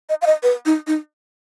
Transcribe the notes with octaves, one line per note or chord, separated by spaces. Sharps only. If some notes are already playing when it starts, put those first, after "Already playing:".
D#5
F5
D#5
B4
D#4
D#4